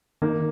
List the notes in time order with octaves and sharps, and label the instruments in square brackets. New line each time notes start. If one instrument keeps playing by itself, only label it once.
[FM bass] D#3 [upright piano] A#3 D#4 A#4